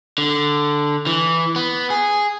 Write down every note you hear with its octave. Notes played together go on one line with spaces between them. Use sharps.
D3
E3
B3
G#4